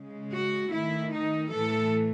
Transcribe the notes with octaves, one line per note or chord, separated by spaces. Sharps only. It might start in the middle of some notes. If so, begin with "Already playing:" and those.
Already playing: C#3 G#3
F#4
D#3 A3 E4
D#4
A2 E3 A3 A4